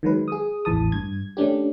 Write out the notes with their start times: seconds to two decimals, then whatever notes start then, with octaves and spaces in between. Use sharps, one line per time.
0.03 D#3 F#3 G#3 B4
0.28 G#4 D#6
0.65 A1 E2 A2 E3 A5 D#6
0.92 G2 G#6
1.37 A3 C#4 D4 G4